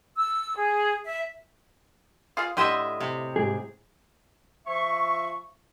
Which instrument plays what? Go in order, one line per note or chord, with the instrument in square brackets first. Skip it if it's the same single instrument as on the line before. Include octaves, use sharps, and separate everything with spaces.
[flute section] E6
G#4
E5
[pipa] F4 G#4 F5
[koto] A2 D#5 E5 [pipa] D3 G4 C6
[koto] C3
[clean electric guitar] G#2 G4 G#4
[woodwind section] F3 E5 C#6